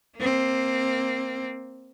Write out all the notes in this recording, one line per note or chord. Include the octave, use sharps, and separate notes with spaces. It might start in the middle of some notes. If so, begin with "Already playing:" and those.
A#3 C4